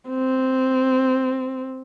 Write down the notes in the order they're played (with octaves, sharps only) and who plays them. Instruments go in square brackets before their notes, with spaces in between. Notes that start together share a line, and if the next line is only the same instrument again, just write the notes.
[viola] C4